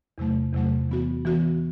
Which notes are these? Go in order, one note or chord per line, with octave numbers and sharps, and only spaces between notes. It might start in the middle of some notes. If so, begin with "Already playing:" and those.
E2 C3 F#3 A3
E2 C3 F#3 A3
E3 B3 F#4
E3 B3 F#4